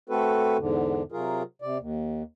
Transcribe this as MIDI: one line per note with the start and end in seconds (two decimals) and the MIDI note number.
0.10 0.57 57
0.10 0.57 60
0.10 0.57 66
0.10 0.57 69
0.10 0.57 71
0.58 1.03 40
0.58 1.03 44
0.58 1.03 50
1.12 1.43 48
1.12 1.43 54
1.12 1.43 65
1.12 1.43 68
1.12 1.43 70
1.62 1.78 48
1.62 1.78 74
1.79 2.23 39